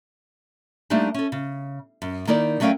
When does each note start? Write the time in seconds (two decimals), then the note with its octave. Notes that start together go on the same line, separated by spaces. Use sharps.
0.90 G3 A3 A#3 C4 D4 D#4
1.15 C#4 A4
1.32 C#3
2.02 F#2
2.27 D#3 A#3 D#4 E4 A#4 D5
2.60 F#3 A3 C#4 A#4 F5 G5